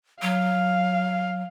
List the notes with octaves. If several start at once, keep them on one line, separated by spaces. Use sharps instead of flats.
F#3 F5